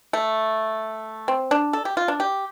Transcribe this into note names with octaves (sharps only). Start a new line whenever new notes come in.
A3
C4
D4
A4
G4
F4
D4
G4